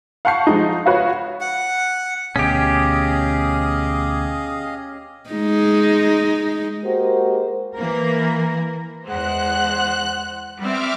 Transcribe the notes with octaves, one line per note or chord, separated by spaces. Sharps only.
F5 F#5 A5 C#6 G6 C7
F3 G#3 D#4
F4 F#4 B4 C#5 F5
F#5
D2 B2 C#4 G4 G#4 D#5 F5
G#3 D#4
G#3 A#3 F#4 G4 A#4 C5
E3 A#3 A#4
E2 G#3 C5 F#5 F#6
G3 B3 C4 E5 D6 F6